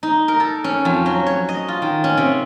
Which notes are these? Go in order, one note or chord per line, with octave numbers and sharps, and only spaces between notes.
D#4
A#4
A4
C#4
F2
F#3
C#5
D#5
F4
D#3
C#4
C3